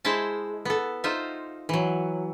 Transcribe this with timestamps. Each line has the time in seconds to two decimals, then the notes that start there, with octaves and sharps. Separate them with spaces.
0.05 G#3 E4 C5 E5 A5
0.65 B3 A4
1.04 D#4 F4 C5 E5
1.69 E3 F#3